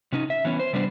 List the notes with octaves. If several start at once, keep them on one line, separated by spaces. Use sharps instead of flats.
C3 C#4 D#4
E5
E3 B3 C#4
C5
C3 G3 B3 D4 C5